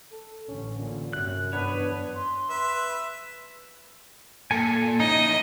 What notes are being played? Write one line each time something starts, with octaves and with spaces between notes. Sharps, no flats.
A4
A1 D3 C#4
A#2
G1 F#2 C3 F#6
G1 F#2 E3 B3 D4 B4 C#5
C6
B4 E5
A#2 A4 G#5
C#4 D#4 E4 D#5